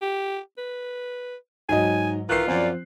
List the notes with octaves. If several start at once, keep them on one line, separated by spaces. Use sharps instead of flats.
G4
B4
G#2 F#3 D#5 G#5
D#3 E3 F4 F#6 C7
F#2 F3 C4 D5